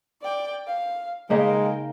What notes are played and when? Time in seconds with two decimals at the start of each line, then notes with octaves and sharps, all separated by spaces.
0.22 D5 G5
0.67 F5
1.30 C#3 G#3 A#3 D#4 A#4 G5